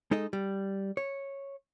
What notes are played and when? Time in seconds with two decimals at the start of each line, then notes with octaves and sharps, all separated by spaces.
0.11 G#3 D#4 A4 D#5
0.33 G3
0.97 C#5